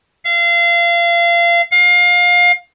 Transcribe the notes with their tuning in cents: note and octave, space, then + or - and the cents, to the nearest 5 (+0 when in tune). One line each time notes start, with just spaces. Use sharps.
F5 -30
F5 +25